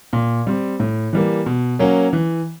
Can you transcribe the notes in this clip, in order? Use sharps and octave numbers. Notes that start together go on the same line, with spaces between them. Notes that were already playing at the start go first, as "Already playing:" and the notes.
A#2
G3 C4
A2
E3 G3 A#3
B2
F#3 A#3 C#4
E3